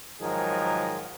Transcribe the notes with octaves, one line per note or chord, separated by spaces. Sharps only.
G#2 D#3 F3 F#3 G#4 A#4